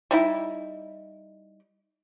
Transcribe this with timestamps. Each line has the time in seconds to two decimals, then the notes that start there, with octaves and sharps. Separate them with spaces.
0.11 G3 D#4 E4